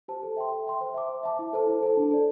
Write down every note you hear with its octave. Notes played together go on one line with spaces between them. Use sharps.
G4 C5 A5
A4
E5 G5 C6
A4
E5 G5 C6
C5
E5 A5 D6
C5
E5 A5 D6
E4
A4 C5 A5
E4
A4 C5 A5
D4
A4 D5